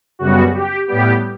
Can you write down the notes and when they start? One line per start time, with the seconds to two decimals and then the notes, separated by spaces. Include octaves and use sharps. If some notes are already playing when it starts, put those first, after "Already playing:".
0.19 F#2 C#3 G3 B3 F#4
0.53 G4
0.88 A2 G3 B3 G4